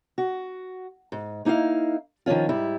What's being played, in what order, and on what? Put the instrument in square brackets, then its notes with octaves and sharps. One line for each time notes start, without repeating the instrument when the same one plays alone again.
[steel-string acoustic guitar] F#4
G#2
A#3 D#4 E4 D#5 F5
D#3 F3 F#3 C#4 F4
G#2 G3 E4